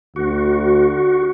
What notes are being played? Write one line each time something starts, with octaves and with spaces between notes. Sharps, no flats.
D2 F#4